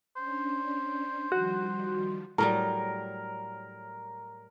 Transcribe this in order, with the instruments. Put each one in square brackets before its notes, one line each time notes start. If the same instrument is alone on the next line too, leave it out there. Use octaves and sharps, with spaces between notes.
[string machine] C#4 D4 [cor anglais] C5
[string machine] D#3 F3 G3 [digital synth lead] F#4
[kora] A2 F#3 G3 [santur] A#4